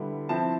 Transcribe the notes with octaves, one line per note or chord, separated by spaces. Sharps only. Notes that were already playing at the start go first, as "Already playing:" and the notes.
Already playing: D3 G3 B3 E4
F3 C4 E4 A5